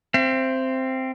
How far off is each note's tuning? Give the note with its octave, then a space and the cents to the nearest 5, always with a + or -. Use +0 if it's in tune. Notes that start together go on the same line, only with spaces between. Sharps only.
C4 +0 E5 +40